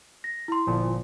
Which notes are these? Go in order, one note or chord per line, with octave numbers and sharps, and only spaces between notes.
A#6
E4 C6
G1 A#2 F3